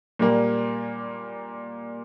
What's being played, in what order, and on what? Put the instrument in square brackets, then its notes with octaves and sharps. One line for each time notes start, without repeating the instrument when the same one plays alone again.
[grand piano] A#2 G3 A#3